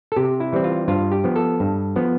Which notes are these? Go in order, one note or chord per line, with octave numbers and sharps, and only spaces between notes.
A4
C3 G4
E4
E3 G3 C4
F4
G2 F4
G4
F3 B3
A4
G2
F3 B3